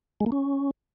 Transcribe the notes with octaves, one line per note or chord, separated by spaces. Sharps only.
G#3
A#3
C#4